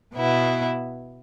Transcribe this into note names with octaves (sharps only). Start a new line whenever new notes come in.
B2 B3 E4